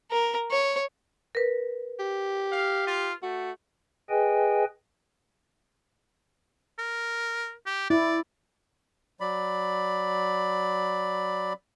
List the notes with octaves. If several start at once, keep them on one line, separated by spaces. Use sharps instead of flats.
A#4
C#5
A#4 B4
G4
F5
F4
A3 F#4
G#4 B4 D#5 G5 G#5
A#4
G4
E4 D5
F#3 D5 B5